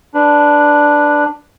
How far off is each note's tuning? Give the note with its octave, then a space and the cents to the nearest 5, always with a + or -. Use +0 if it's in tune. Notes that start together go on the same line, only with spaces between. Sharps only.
D4 +0 B4 +0